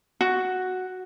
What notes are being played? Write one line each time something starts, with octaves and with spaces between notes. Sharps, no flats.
F#4